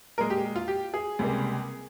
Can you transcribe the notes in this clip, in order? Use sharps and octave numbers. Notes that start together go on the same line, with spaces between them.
A#2 G#3 A#4
G4
F4
G4
G#4
C#2 C3 G3 A#3